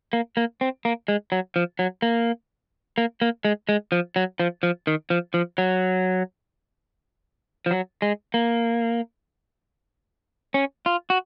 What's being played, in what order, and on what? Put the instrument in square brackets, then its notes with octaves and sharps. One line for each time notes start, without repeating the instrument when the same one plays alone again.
[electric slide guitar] A#3
A#3
C4
A#3
G#3
F#3
F3
F#3
A#3
A#3
A#3
G#3
G#3
F3
F#3
F3
F3
D#3
F3
F3
F#3
F3
F#3
G#3
A#3
C#4
F4
F#4